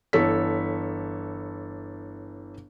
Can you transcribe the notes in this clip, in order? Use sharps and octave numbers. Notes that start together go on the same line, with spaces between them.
G1 E3 A4 C#5 B6